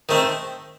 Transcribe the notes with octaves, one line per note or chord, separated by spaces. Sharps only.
D#3 A3 C4